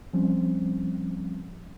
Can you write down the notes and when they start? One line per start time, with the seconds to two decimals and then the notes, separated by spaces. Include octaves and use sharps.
0.13 F3 G3 C4 C#4